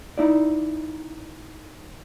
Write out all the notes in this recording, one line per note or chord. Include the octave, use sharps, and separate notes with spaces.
D#4 E4 D5